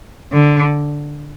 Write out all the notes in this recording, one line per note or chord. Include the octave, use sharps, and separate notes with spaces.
D3